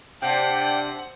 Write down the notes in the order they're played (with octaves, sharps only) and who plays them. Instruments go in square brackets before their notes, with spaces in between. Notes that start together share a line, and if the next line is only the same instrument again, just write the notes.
[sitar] C3 [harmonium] D4 [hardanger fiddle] F#5 [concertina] G5